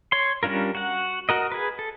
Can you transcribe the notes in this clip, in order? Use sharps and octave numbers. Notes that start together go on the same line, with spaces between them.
C#5 C6
G3 C#4 D4 F4 A#4
F#4 F#5
F#4 A#4 D#5
G#4 B4
A4